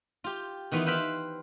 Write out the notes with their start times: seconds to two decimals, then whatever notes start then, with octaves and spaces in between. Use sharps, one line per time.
0.24 F4 G4
0.72 D#3 E3 B3 F4
0.87 B4 C5 E5 F5 G5 B5